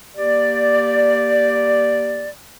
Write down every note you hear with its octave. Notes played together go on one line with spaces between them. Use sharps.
A#3 G4 D5